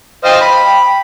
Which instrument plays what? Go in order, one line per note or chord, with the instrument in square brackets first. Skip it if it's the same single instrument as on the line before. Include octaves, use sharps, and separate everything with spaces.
[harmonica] C5 D#5 F5 [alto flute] G5
[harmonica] B5